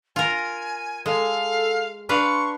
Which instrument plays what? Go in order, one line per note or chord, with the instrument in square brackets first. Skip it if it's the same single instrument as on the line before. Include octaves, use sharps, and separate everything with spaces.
[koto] F4 A#4 [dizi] G#5
[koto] G#3 [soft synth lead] A4 [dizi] F5
[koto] D4 B4 F5 [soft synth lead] C6 [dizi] C#6